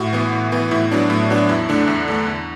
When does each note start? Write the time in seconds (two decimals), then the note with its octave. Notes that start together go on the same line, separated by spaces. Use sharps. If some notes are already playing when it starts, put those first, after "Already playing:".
Already playing: A2 F#4
0.13 E3 B3
0.33 A2
0.52 E3 B3
0.71 A2 E4
0.91 F#3 B3 D4
1.10 A2
1.30 F#3 B3 D4
1.49 E2 E4
1.69 D3 A3 D4
1.88 E2
2.08 D3 A3 D4
2.27 E2